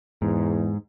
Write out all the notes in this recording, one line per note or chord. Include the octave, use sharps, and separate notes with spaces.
E2 G#2